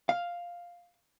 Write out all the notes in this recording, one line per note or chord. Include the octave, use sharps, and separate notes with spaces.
F5